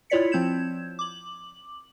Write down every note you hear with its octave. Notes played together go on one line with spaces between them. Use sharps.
E4 F4 C#5 D5 B6 C#7
F3 C4 G6 G#6 E7
D6 F#7